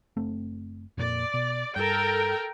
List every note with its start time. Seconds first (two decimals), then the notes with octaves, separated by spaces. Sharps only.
0.17 F#1 A3 C4
0.97 F2 A#2 A#3 D5
1.34 B2
1.76 G2 A4 A#4 G5